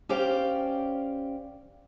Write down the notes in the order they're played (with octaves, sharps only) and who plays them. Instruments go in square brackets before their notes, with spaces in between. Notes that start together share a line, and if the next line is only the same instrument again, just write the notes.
[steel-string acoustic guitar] C#4 G4 C5 D5 F5 G5